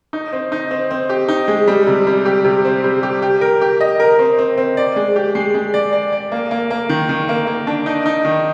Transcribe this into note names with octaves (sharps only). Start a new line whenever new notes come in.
D#4
C4
D#4
C4
C4
G4
D#4
G#3
G3
C3
G3
G4
C3
C4
G3
G4
G4
A#4
G4
D#5
A#4
C4
C4
C4
D5
G#3
G4
G#3
G#3
D5
D5
D5
A#3
A#3
A#3
D#3
D#3
A#3
A#3
D4
D#4
D#4
D#3